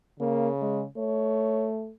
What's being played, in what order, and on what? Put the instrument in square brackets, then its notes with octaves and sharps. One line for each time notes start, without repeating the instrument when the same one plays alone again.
[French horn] C#3 [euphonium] A#3
[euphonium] G#3
[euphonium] A3 [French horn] C#5